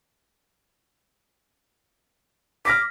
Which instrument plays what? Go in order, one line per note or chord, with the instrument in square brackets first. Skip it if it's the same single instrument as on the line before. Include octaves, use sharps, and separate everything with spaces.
[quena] D6 [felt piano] F6 A#6 B6